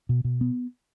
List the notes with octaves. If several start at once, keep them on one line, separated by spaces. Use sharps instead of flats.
B2
B2
B3